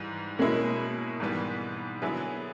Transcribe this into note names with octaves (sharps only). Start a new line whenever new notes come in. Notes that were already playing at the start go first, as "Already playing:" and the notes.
Already playing: G#2 E3 G3
B2 G#3 A#3 C#4 E4
G#2 E3 G3 B3
D3 F#3 B3 E4 G#4